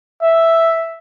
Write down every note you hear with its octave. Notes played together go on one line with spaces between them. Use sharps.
E5